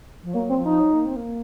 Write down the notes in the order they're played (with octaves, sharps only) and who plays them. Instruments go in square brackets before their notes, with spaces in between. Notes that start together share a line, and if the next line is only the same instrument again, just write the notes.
[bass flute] F3
[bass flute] F#3 [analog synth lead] A#3
[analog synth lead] C4
[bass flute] F3
[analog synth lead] D#4
[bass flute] F#3
A#3
C4
A#3